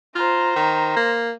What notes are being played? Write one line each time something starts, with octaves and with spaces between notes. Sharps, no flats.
F4 C5 A#5
D#3
A#3